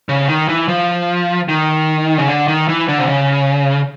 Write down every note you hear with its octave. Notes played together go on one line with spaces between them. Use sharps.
C#3
D#3
E3
F3
D#3
C#3
D3
D#3
E3
D3
C3
C#3